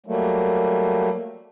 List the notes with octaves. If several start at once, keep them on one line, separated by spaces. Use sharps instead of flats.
F#3 G3 A3 A#3